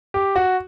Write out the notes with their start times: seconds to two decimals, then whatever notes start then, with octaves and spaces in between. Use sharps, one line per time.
0.14 G4
0.36 F#4